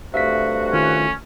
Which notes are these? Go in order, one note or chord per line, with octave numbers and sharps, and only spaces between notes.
G2 C3 A3 F#4 E5 F5 B6
D#3 C#4 F4